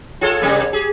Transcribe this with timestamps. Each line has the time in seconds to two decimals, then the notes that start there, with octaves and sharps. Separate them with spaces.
0.21 F4 G#4 A4 C#5
0.42 C3 G3 A#3
0.73 G4 G#4